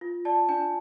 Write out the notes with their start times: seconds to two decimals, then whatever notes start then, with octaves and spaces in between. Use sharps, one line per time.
0.01 F4
0.25 D5 A5
0.49 D4 G#5